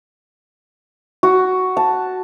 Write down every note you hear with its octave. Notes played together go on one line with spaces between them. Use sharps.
F#4
A5